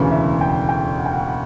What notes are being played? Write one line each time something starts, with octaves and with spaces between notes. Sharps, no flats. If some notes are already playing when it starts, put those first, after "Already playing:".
Already playing: E1 D2 C#3 E3
E5
G5
G5
F#5
G5
F#5
F#5